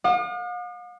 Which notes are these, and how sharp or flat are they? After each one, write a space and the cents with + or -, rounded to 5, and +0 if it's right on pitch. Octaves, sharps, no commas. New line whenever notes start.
F5 +45 D#6 -45